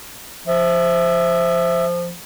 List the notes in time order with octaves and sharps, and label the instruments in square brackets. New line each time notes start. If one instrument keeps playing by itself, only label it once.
[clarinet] F3 [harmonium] E5